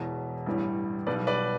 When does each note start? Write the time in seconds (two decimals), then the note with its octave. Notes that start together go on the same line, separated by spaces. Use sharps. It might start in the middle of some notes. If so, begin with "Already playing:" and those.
Already playing: E1 E2 B2
0.46 A1 G2 E3 G3
1.07 B1 B2 G3 B4 D5
1.27 B4 D5